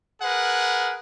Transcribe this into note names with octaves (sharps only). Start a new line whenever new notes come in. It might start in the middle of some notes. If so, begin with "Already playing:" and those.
G#4 A#4 B4 F#5